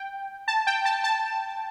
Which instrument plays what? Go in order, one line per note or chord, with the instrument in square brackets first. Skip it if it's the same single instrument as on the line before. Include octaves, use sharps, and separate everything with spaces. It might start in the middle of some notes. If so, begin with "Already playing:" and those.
Already playing: [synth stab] G5
A5
G5
A5
A5